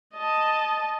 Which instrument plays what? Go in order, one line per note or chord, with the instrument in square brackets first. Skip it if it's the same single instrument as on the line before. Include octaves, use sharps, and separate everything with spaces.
[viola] D#5 A5